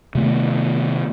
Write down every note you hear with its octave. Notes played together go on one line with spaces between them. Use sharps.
C3 D#3 A3 B3